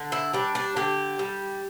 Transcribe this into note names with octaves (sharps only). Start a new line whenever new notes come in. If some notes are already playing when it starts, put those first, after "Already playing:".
Already playing: D3
E4
G3 D4
D4
D3 G4
G3